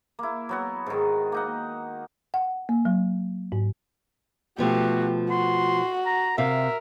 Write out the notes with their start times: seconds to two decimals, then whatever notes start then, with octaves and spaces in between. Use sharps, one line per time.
0.19 A#3 E4
0.49 F#3 B3 F#4
0.86 G#2 D#3
1.32 A#3 D#4 F#5
2.34 F#5
2.69 A#3
2.85 F#3
3.52 G#2
4.59 B2 F3 A3 F#4 G4
5.31 F#4 C6
6.06 A#5
6.38 C3 A#4 E5 F5